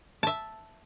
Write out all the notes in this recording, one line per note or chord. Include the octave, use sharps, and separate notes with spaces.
E5 A5